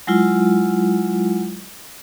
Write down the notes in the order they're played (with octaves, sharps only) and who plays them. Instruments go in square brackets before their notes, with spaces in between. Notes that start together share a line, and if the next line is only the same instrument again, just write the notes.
[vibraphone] F#3 G#3 E4 F4